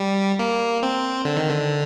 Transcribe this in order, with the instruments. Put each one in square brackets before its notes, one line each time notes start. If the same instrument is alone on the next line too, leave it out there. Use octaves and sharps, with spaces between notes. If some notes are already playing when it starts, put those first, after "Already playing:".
Already playing: [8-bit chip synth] G3
A#3
C4
D3
D#3
D3